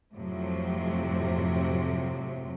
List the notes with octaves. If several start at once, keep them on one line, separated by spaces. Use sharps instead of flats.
F2 A2 C3 F3 F#3